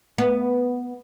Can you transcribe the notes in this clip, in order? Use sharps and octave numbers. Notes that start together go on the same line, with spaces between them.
B3